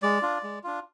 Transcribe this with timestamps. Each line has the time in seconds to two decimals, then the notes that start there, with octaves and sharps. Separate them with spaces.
0.03 G#3 D5
0.22 D4 F4
0.43 G#3
0.64 D4 F4